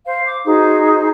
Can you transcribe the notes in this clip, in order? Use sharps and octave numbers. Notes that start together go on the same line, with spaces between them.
C5 F5
D6
D#4 F#4 G#4 C5